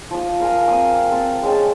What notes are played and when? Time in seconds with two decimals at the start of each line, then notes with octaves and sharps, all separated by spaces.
0.11 F3 D#6
0.40 A#4 C5 F5 G#5
0.68 C4 D#6
1.10 C4 A4
1.42 G#3 C#4 G5 A5